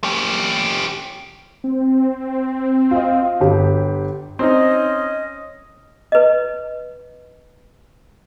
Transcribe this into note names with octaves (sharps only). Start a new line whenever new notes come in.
C#4 G4
C4
F4 D#5
G1 G4
C4 C#4 D#4 D#5
B4 D#5